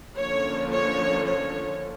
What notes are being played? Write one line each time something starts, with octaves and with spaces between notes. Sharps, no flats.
D3 F3 A#3 C#4 C#5
C#5
C#5